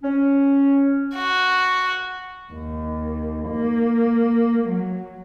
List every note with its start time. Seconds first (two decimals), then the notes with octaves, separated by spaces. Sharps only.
0.03 C#4
1.16 F#4
2.53 D#2
3.50 A#3
4.69 F#3